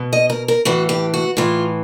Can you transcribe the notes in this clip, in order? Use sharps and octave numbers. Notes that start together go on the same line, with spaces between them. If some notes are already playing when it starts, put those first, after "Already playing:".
Already playing: B2
D#5
A#4
A#4
A2 E3 F#4
G4
F#4
A2 E3 F4